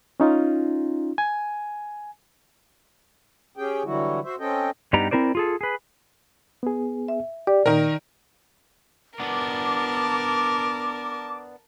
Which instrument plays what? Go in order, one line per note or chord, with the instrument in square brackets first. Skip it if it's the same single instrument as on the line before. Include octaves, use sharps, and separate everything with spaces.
[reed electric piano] C#4 D#4 F4
G#5
[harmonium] C#4 G4 G#4 G5
D3 E3 F#3 G3 E4 F#4
F#4 C5 E5
C4 C#4 A4 D#5 G5
[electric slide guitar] G2 G3 B3 D#4 G4 A#5
C4 E4 A#4 C5 D5
F4 G#4 A4
G#4 B4
[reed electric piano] B3 G#4
[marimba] E5
[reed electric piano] G4 [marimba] D5
[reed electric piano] A#2 [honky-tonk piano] D#3 A#4
[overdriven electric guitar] B3 D4 [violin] A#4 A5 [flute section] D6